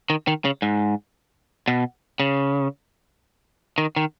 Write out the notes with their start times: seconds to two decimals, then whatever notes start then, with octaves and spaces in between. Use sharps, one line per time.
0.10 D#3
0.27 D#3
0.45 C#3
0.62 G#2
1.68 B2
2.20 C#3
3.78 D#3
3.96 D#3